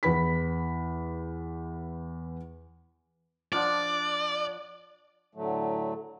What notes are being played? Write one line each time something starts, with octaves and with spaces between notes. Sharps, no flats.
E2 B4 B5 B6
F3 D4 D5 F#5
A2 D3 F#3 A3